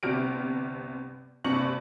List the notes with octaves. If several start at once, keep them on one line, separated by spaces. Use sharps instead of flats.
G1 C2 C3 F6 D7
F#1 G2 C3 C#6 C#7 F#7